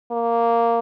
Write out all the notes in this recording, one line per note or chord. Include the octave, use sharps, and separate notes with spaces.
A#3